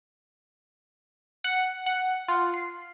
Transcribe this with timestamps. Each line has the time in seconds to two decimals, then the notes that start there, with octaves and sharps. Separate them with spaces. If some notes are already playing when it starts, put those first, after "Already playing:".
1.44 F#5
1.86 F#5
2.28 F4
2.54 C7